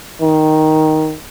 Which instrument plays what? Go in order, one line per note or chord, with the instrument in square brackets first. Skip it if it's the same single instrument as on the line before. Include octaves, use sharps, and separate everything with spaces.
[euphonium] D#3